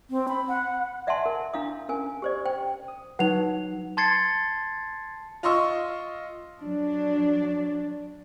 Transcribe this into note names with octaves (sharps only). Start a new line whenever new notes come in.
C4
B5
F#5
D5 E5 F#5 G#5 A5 C6
A#4
D4 E4 F5 D#6
C#4 A#4 G#5
G4 C5 D5
C5 G5
D#6
F#3 D#4 B4 F#5 F7
A5 C6 G#6 A6 C7 C#7
F4 D#5 C6 C#6 E6
F#3 D4